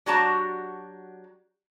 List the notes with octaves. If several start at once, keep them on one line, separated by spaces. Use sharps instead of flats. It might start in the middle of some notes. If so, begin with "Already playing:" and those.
F#3 D4 F#4 G4 A5 A#5